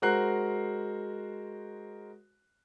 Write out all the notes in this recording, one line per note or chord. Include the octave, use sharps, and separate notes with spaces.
G#3 F#4 A#4 C5 F#6 C7